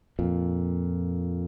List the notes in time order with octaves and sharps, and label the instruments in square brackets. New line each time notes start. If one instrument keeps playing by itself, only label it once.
[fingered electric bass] F2 A#2